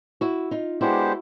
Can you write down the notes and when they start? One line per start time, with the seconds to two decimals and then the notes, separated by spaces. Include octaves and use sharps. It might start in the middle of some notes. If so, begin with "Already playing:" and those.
0.21 E4 F#4
0.51 D#4 F4
0.81 G#3 B3 D4 E4 F#4 G4 C5